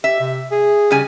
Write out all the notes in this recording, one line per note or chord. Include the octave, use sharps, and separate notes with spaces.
G4 E5
C3
G#4
C#3 G3 G#5